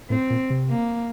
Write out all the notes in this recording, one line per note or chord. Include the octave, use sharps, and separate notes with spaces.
A2 C4
A#2
C3
A#3